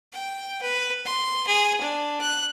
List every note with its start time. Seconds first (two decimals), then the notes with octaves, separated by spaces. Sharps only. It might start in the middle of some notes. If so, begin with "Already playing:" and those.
0.13 G5
0.62 B4
1.05 C6
1.47 G#4
1.81 D4
2.21 F#6